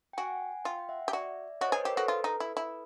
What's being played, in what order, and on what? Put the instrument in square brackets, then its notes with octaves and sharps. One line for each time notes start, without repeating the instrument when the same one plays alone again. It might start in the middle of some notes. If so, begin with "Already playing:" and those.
[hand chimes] G5
[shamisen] F#4 [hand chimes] F#5 G#5
[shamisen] F4 [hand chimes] F5 G5
[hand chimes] G5
E5 F#5
[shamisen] G4
[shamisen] F#4 [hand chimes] D5 E5
[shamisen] F#4 [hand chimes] C#5 D#5
[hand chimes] C5
[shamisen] G#4 [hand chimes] B4 C#5
[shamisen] G4 [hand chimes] A#4 C5
[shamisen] F#4 [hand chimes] A4 B4
[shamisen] F4
D#4
E4
E4